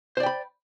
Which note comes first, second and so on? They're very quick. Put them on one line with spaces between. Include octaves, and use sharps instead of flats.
C5 D5 G5 B5